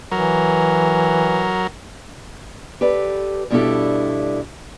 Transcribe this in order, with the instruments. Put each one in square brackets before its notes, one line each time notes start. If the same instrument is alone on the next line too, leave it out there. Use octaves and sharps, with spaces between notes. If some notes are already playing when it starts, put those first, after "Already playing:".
[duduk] E3 [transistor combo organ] F#3 A#4
[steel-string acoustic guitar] G4 A4 B4 D5
G2 B2 D4 E4 G4 A4